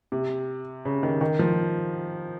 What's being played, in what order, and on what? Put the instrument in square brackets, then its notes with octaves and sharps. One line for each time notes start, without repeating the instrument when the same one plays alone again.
[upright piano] C3
C#3
D#3
D#3
F3